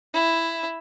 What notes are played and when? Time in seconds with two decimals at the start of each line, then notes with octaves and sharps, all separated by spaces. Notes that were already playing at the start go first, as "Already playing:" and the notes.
0.14 E4